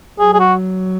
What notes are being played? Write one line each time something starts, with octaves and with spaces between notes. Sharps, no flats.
F#3 G#4
G#4
F#4